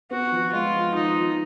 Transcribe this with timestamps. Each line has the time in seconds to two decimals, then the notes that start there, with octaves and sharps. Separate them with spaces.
0.11 B3 F#4
0.32 F3
0.53 G#3 F4
0.74 F3
0.95 F3 D#4
1.15 F3